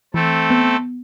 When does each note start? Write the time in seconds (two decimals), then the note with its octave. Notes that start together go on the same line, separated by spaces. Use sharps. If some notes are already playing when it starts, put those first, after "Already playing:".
0.14 E3 A3 C4 A4
0.50 B3